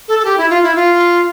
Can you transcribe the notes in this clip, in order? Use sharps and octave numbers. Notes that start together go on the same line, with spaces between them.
A4
A4
G4
E4
F4
E4
F4